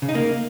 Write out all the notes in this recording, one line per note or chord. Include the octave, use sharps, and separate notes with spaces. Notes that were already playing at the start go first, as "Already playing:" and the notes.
C#3
D#4
A#3